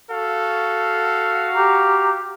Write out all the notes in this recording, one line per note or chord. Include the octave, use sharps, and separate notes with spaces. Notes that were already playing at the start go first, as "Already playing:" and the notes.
F#4 A4 F5
G4 A#5